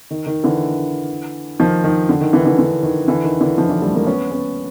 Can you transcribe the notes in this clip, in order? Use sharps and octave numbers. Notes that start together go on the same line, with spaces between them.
D#3
D#3
D3 E3
D#3 F3
D#3
D3
D#3
D3 E3
D3 E3
D3
D#3
D3 E3
D#3
D3 E3
D#3 F3
D3 E3
G3 A3
G#3 A#3
B3 C#4
B3 C#4